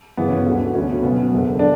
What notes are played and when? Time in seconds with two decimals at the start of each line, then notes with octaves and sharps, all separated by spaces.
0.17 G1 F#2 C#3 E3 B3
0.28 C#4
0.37 B3
0.46 D2 D3
0.70 B3
0.74 D2 D3 C#4
0.89 C#4
1.02 B1 B2 B3
1.31 F#1 E2 D3
1.59 D3 D4